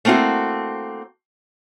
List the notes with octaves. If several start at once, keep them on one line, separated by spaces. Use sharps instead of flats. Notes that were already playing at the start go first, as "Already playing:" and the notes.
A3 A#3 C4 E4 F#4